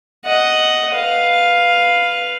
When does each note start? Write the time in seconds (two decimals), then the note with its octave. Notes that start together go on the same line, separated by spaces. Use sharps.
0.25 D#5 F#5
0.94 B4 F5